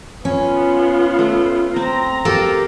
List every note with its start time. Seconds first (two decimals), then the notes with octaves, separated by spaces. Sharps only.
0.25 B3 C#4 F4
1.19 A3
1.76 C4 A#5
2.25 G4 A4 A#4 F5